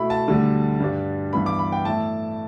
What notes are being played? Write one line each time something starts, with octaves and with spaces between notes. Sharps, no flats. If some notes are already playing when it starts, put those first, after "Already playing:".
Already playing: B2 A3 E4 B5
A5
D2 D3 G3
G2 G3 D4
G2 E3 B3 B5
D6
B5
G5
A2 A3 E4 A5